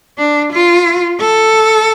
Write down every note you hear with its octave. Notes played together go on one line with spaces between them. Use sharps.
D4
F4
A4